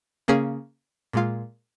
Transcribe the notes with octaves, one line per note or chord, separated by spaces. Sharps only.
C#3 A#3 C#4 G#4
A#2 G#3 F4